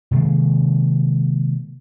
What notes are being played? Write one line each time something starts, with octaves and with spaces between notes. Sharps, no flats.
C3 D#3 G#3 A#3